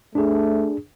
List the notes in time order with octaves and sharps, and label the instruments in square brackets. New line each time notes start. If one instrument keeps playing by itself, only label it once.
[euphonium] A3 [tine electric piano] D4 G#4